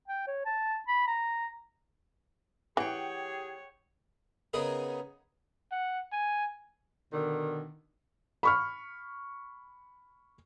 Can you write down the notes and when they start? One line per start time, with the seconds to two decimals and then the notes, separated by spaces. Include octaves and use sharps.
0.08 G5
0.27 C#5
0.46 A5
0.88 B5
1.07 A#5
2.77 E3 G4 G#4 C#5 F#5 G5
4.53 C#3 B3 D#4 G#4 A#4
5.71 F#5
6.12 G#5
7.12 B2 D3 D#3
8.43 B5 C#6 F6